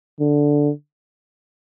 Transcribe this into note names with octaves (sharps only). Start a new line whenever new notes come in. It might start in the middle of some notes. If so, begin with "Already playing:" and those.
D3